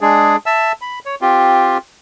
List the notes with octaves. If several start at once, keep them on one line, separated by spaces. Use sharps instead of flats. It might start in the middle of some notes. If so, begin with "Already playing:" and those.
G#3 D4 G#4
E5 A5 E6
B5
C#5
C4 F4 G4